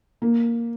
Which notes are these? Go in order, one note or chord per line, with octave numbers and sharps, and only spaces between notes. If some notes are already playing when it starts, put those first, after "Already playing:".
A#3